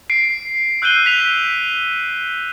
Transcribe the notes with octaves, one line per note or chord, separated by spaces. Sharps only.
C7 D7
E6 F#6 G6 C7 D#7 G7
F#6 B6 F7